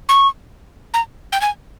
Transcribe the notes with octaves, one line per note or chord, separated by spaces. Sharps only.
C#6
A#5
G5
G#5